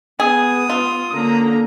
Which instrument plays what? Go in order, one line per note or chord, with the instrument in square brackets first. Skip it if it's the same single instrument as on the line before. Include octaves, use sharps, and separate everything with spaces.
[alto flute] B3 [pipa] G#4 [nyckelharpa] D#6
[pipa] F4
[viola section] D3 A#3 A#5 [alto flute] C#4